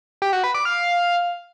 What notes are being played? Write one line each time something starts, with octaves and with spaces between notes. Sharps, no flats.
G4
F#4
B4
D5
F5